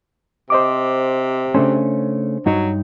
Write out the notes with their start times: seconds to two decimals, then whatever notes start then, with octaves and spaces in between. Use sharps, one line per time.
0.50 C3 C5 D#5 D6
1.54 C#3 A3 C#4 D4 C5
2.46 G2 F#3 D#4 C#5